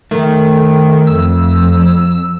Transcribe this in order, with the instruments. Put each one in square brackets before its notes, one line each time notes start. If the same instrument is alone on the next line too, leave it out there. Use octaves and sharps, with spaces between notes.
[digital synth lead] D#3 [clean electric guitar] A3
[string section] F2 [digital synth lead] E6